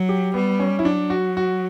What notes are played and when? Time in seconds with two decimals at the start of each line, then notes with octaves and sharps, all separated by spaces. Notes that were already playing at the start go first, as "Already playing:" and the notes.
Already playing: F#3
0.09 G4
0.34 G3 B3
0.60 C#4
0.79 E4
0.85 F#3 D4
1.10 F#4
1.37 F#4